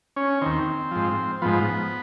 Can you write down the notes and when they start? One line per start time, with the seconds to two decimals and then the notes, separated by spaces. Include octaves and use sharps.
0.16 C#4
0.41 D#2 D#3 C4
0.91 G#2 F3
1.42 G#2 F3 B3